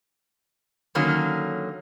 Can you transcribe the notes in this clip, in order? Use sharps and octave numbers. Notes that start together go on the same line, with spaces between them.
D3 D#3 F#3 A#3 C#4